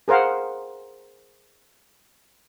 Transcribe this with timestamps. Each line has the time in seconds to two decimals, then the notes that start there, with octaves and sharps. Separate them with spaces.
0.08 G#4 A#4 C5 F5 F#5